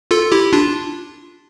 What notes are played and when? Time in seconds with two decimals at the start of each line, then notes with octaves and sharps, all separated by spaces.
0.11 F4 A4
0.32 E4 G4
0.53 D4 F4